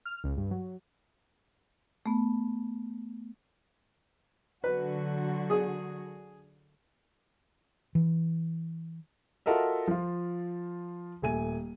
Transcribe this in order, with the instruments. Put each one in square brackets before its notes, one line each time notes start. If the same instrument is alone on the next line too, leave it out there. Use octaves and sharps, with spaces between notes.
[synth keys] F6
C#2
G2
F#3
[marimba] A3 B3
[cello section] D3 F#3 F#4 [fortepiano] B4
[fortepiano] G#4
[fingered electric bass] E3
[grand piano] F4 F#4 A4 A#4 D#5 E5
F3 F4
D#1 A3 G#5 D#7